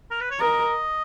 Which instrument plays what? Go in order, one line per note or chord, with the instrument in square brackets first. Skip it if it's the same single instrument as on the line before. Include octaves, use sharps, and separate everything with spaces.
[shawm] A#4
B4
C#5
[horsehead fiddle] A#4 [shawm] D#5